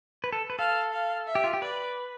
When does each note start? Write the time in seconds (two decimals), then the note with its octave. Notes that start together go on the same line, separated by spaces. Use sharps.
0.24 B4
0.33 A4
0.50 B4
0.58 A4 F5
0.93 F5
1.27 E5
1.35 G4
1.44 F4
1.53 G4
1.62 B4 D5